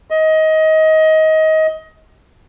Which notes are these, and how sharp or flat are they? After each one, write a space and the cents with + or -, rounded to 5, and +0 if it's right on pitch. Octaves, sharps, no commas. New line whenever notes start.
D#5 +20